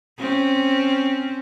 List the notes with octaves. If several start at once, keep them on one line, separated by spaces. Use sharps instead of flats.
C4 C#4